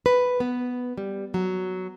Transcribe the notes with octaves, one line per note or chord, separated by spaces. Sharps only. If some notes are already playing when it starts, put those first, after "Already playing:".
B4
B3
G3
F#3